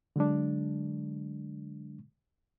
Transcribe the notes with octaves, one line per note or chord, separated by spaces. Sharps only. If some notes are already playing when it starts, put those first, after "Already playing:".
D3 F#3 G#3 D4